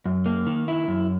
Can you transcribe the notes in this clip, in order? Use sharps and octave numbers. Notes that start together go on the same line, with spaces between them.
F#2
A#3
D#3
E4
F#2